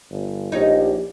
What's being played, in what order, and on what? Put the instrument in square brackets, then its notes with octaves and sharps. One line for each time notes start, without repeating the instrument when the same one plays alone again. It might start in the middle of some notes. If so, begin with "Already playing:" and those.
[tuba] G1
[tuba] A#1 [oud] C#4 D#4 [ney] G4